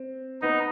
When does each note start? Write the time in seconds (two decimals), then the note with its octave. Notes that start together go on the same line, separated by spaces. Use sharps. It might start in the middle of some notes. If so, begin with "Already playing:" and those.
Already playing: C4
0.42 B3 D#4